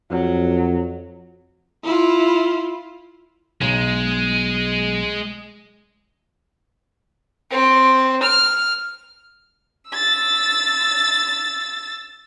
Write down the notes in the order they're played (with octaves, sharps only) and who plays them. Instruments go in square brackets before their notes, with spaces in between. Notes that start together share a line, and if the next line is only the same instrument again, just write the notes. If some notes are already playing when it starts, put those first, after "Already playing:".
[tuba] F2 [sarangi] F#3
[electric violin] E4 F4
[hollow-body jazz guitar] B1 [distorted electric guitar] G#3
[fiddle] C4
F6
[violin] E6 A6